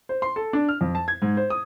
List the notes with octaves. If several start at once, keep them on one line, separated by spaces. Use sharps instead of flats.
C5
C6
A4
D4
F6
F2
A5
G#6
G#2
C5
D#6